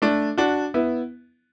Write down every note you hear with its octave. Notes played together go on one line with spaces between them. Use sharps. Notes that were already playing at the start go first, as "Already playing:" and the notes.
A3 D4
D4 F#4
B3 E4